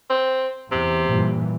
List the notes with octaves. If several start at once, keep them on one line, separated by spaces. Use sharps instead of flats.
C4
E2 C3
G2 A#2 E3